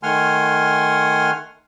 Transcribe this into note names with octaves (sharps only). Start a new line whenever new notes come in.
D#3 A3 F#5 G#5 C6 F6